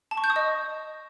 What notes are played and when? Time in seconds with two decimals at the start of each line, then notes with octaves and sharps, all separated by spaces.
0.11 A5
0.17 C#6
0.24 G6
0.30 D#6
0.36 D#5